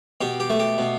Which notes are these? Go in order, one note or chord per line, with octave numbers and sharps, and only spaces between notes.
B2 G4
G4
A3
G4
B2